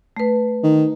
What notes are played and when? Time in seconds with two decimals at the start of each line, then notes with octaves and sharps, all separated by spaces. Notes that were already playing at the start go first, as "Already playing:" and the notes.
0.17 A3 B4
0.63 D#3